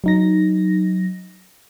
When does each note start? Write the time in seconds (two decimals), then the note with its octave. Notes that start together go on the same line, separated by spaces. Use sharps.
0.04 F#3 D#4 A#6